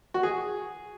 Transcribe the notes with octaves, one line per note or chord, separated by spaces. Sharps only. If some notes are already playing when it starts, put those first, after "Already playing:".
F#4
G#4